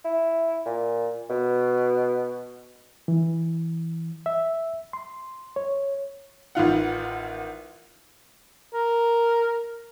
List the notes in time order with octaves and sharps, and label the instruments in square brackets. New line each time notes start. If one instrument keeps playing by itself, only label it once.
[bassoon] E4
A#2
B2
[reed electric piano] E3
E5
C6
C#5
[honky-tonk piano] A1 D#3 F4 F#5
[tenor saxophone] A#4